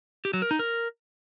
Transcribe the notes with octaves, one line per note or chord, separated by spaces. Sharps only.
G4
F#3
A#4
D#4
A#4